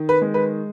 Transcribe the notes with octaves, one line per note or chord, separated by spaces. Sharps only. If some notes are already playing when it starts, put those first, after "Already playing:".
Already playing: D#3
B4
G#3
B4